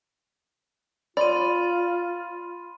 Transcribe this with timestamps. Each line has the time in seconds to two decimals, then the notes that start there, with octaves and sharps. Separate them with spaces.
1.17 F4 D5 B5 C6 D#7